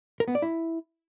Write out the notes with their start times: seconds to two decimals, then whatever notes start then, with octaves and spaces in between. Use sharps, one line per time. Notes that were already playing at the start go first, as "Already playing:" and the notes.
0.20 A#4
0.28 B3
0.35 D5
0.42 E4